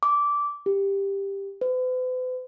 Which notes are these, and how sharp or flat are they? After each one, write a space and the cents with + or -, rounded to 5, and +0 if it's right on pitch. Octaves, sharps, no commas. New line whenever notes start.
D6 -15
G4 +10
B4 +45